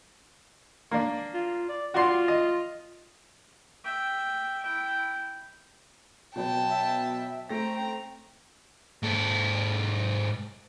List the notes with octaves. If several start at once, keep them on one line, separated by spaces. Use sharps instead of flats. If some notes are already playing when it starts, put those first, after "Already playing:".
A#3 D4
F4
D5
F4 F#4 D5 C6
D#5
E5 G5
E4 G5
B2 F#3 B3 G5 A5
E5
A3 C4 G5 A#5 A#6
G#2 A4